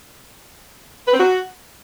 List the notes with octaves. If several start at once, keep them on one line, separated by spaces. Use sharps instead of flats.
B4
C4
F#4